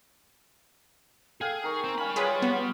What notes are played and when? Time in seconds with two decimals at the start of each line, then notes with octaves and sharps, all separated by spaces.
1.41 G#4 A4 F5 G5 G#5
1.64 D#3 A#5 C#6
1.84 C4
1.98 G3 C#4 F5 G#5 B5
2.16 G#3 F4 G#4 B4 C#5
2.42 B3